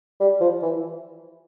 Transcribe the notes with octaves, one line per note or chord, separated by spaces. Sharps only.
G3
F3
E3